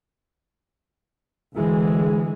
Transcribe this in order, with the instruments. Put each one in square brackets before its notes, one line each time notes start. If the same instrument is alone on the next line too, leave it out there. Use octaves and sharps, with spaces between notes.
[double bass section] D2 E3 G#3